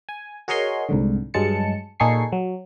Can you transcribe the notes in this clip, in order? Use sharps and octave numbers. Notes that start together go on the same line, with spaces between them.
G#5
F#4 G#4 A#4 C#5 D#5 C6
C2 G#2 D3
G2 F#3 G#3 A5 C#7
A#2 D#4 G#4 A4 C#6 C7
F#3